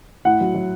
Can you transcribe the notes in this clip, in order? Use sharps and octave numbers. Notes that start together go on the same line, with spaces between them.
A2 F#5
F#3
F#3